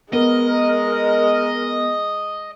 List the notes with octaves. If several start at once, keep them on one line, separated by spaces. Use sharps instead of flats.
G#3 B3 A#4 D#5